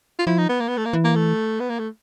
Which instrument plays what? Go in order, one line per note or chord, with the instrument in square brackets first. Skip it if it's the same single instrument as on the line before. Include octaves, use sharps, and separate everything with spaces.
[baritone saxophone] F4
[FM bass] F3 [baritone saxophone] E4
[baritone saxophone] D#4
B3
A#3
B3
A3
A#3
[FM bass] E3
[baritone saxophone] A#3
A3
B3
A#3
A3